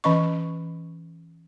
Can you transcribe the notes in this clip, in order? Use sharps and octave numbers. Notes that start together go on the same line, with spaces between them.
E3 C#4 D#5 C#6